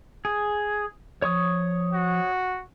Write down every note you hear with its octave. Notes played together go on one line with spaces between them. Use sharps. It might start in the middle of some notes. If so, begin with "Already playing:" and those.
G#4
F3 C#5 C#6 D#6
F#4